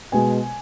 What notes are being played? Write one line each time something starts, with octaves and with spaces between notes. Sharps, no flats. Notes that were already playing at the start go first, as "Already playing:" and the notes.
B2 G#3 G#5